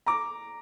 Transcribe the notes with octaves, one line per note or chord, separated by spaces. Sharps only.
A#5 D6